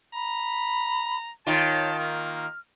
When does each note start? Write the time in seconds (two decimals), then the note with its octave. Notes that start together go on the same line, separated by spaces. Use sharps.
0.14 A#5 B5
1.47 D#3 F4 C#5 A5
1.99 A#3 F6